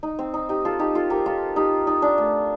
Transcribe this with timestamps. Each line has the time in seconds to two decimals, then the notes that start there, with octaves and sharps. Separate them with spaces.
0.03 D#4
0.19 C4
0.34 D#4
0.49 D#4 G4
0.65 F4 A4
0.79 D#4 G4
0.95 F4 A4
1.10 G4 A#4
1.26 F4 A4
1.56 D#4 G4
1.87 D#4
2.02 D4
2.18 A3